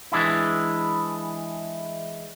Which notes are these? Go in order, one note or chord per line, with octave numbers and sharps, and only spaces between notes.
E3 G#3 D4 E4